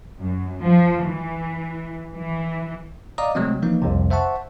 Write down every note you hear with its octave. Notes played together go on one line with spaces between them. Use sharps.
F#2
F3
E3
E3
D5 D#5 F5 A#5 D6 D#6
C3 F#3 G#3 A3 C4
E3 F3 A#3 D#4
C2 F2 C3
C5 E5 F#5 A5 C#6